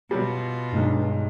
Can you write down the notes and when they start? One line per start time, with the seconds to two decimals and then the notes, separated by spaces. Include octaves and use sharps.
0.11 B2 F#3 G3 F4
0.73 B1 G2 G#3 D#4